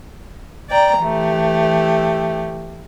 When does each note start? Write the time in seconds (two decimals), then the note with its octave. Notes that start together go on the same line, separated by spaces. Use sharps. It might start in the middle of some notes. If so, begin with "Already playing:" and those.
0.70 D5 G5 A#5
1.01 E3 A3 G4